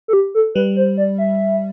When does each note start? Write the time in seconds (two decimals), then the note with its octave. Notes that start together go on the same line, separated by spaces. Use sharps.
0.08 A4
0.13 G4
0.35 A4
0.55 G3 B4
0.77 C5
0.97 D5
1.18 E5